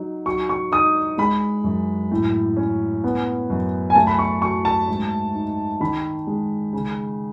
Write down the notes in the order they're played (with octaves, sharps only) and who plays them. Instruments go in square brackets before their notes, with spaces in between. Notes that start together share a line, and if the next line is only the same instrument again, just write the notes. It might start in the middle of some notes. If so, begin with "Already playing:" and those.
Already playing: [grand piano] F#3 D#4
F#3 C#6
C#6
D#4 D#6
G#3 B5
F#2
A2
C#4
B3
F#2
G#5
A3 A5
B5
C#6
F#3 C#6
A5
G#2
D#4
D#3 B5
G#3
C#3